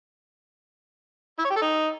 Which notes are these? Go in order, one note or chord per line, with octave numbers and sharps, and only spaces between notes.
E4
C#5
G4
A4
D#4